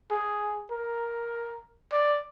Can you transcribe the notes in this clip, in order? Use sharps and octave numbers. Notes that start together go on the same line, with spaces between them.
G#4
A#4
D5